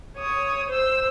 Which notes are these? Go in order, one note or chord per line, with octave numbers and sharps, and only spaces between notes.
C#5 D#6
C5 E6